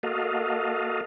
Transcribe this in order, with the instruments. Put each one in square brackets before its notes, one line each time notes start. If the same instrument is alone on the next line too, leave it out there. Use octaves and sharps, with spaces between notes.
[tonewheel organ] A#3 F#4 A4 D#5 F5